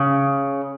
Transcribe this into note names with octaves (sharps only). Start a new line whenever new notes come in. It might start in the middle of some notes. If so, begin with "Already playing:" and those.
Already playing: C#3